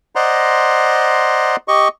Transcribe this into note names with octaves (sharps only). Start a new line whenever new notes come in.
C5 D5 D#5 F#5 A#5 C6
G4 D#5 C#6